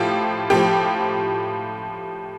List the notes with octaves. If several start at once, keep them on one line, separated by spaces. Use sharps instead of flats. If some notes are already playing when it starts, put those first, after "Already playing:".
Already playing: A2 F3 F4 G4
A2 F3 G4